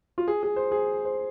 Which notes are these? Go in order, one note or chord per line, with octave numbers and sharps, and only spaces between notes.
F4
G#4
G#4
C5
G#4
C5